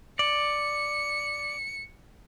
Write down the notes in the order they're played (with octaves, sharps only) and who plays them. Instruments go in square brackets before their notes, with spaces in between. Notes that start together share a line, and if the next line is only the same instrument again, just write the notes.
[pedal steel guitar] D5 [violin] C#7